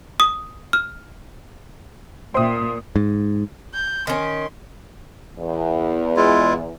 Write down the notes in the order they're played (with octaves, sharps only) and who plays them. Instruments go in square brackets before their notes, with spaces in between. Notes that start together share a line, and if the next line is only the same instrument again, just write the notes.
[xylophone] D#6
F6
[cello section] A#2 [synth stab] C5 E5 G5 [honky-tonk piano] C6 D#6
[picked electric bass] G#2
[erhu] G6
[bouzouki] D#3 C#4 [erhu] C6
[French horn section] E2
[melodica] G#3 E4 F4